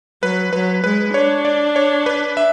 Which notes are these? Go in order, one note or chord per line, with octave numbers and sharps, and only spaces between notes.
F#3 B4
F#3 B4
G#3 B4
D4 C#5
D5
C#5
B4
E5